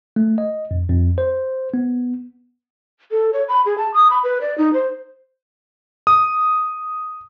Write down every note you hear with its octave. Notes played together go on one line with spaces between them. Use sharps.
A3
D#5
F2
F2
C5
B3
A4
C#5
B5
G#4
A5
D#6
B5
B4
D5
D#4
C5
D#6